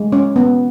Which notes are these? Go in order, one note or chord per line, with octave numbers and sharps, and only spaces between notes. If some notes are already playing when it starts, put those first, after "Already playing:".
Already playing: G#3
C#4
B3